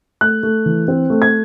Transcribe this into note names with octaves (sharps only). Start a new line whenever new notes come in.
A3 F#6
A3
E3
C4
A3
G#6